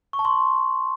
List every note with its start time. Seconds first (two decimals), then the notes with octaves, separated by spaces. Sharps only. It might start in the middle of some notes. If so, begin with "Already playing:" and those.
0.13 C#6
0.19 A5
0.25 C6